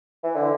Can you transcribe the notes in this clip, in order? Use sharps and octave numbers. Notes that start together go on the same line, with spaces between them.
E3
D3